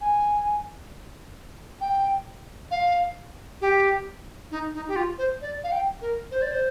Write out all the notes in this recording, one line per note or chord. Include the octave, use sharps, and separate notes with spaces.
G#5
G5
F5
G4
D#4
D#4
G4
F4
C5
D5
F5
G5
A#4
C5
D5
C5